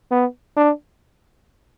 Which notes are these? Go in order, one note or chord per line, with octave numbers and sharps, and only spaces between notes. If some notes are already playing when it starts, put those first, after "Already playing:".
B3
D4